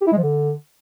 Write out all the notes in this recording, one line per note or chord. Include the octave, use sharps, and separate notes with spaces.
G4
E4
G#3
F3
D3